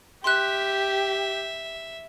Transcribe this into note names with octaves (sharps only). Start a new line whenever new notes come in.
G4 E5 C6 F#6